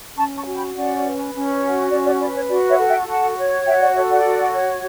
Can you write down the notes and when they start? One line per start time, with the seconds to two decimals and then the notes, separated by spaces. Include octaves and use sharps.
0.17 C#4 A5 C#6
0.37 A5 C#6
0.46 F#4
0.55 G5 B5
0.75 C#4 D5 F#5
1.04 B4
1.33 C#4
1.62 F#4
1.91 C#4 D5
2.06 D5
2.20 B4 D5
2.35 C#5
2.49 F#4 D5
2.69 C#5 E5
2.78 A4
2.88 E5 G5
3.08 F#4 F#5 A5
3.37 C#5
3.66 F#4 E5 G5
3.80 D5 F#5
3.95 A4 C#5 E5
4.09 D5 F#5
4.24 F#4
4.53 C#5